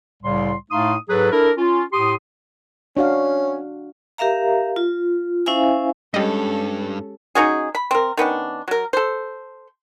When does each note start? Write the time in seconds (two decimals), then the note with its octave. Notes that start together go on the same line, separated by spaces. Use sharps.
0.23 C2 A2 C#3 G3 C6
0.70 A2 A3 D#4 F5 C6 D#6
1.09 G#2 F#3 G#4 A4 B4
1.30 D4 E4 A4 A#4
1.57 C#4 F4
1.92 A2 G4 C6 D#6
2.97 C#4 D4 F#4 F5
4.18 G4 A#4 E5 F5 A#5
4.76 F4
5.46 C#4 E4 C5 E5 F5 G#5
6.14 G2 G3 G#3 C#4 G4 A4 D#5
7.35 C#4 D#4 F#4 G#4
7.75 B5
7.91 C4 A#4
8.17 D#3 B3 C#4 D4
8.68 F#3 A#4
8.93 A4 C5